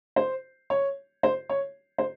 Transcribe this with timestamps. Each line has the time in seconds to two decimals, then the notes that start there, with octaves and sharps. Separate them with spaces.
0.16 C5
0.70 C#5
1.23 C5
1.49 C#5
1.98 C5